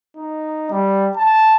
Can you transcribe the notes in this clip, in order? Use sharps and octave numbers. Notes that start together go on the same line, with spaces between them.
D#4
G3
A5